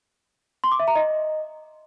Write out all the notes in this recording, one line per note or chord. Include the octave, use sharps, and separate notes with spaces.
C6
D6
E5
A#5
D#5